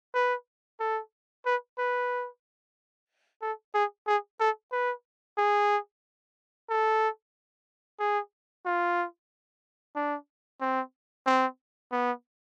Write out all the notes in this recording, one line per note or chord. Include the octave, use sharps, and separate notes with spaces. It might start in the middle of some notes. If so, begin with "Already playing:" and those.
B4
A4
B4
B4
A4
G#4
G#4
A4
B4
G#4
A4
G#4
F4
D4
C4
C4
B3